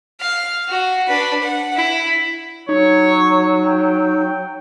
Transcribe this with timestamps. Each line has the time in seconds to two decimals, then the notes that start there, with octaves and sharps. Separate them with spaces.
0.20 F5
0.69 F#4
1.08 D4 B4
1.43 F#5
1.76 E4
2.69 F#3 D#4 C#5
3.64 G5